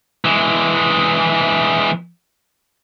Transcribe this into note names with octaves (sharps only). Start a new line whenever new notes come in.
E3 G#3